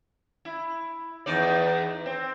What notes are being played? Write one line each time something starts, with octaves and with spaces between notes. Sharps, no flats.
E4
E2 D#4 D5
C4